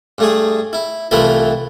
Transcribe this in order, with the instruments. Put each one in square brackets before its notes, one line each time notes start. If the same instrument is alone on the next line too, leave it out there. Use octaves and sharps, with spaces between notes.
[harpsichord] G2 A3 G#4
E4
C2 E3 F3 A3 E4 B5